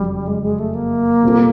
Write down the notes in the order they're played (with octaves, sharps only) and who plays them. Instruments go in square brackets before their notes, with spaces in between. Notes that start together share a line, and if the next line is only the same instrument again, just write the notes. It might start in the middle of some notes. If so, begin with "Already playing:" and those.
Already playing: [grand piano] F#1 F2 C#3 F#3 [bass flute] G3
[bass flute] G#3
G#3
A3
A#3
[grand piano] B2 G3 C4 F4 A4